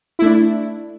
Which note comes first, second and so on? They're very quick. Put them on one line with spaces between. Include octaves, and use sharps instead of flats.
E4 A3 D4